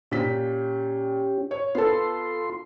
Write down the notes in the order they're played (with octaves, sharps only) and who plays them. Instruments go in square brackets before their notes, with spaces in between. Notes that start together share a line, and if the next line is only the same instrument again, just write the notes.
[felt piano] A#2 B6 [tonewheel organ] C#4 G4
[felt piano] C#5
[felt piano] B3 A4 [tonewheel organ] F4 C6